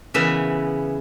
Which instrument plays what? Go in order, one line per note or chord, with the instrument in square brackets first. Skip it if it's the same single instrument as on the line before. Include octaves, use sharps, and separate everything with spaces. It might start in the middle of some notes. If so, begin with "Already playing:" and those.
[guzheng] C#3 E3 B3 E5